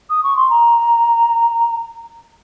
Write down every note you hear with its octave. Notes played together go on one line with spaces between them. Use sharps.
D#6
C#6
C6
A#5